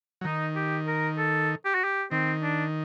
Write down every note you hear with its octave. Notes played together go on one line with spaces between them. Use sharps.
F#3
D#3 D#4
G4
A#4
A4
G4
F#4
G4
D#3 C4
D4